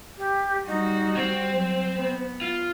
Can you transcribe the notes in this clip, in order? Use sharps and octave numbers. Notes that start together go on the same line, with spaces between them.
G4
G3 D#4 F#4
C4
F#3 C5
B3
F4